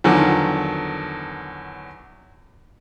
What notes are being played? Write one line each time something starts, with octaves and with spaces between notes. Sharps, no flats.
E2 D3 D#3 F3 F#3